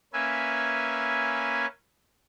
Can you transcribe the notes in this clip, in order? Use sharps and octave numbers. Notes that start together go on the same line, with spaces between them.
A#3 C#4 B4 E5 G#5